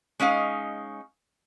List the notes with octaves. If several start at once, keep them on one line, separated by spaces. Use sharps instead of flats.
G#3 C#4 D#4 F5